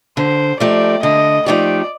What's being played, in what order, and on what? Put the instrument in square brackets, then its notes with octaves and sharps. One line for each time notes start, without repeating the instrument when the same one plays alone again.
[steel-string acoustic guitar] D3 [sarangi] C5
[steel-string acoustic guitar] F3 A3 D#4 G4 [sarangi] D5
[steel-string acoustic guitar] D3 [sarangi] D#5
[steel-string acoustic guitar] F3 A3 D#4 G4 [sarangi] D5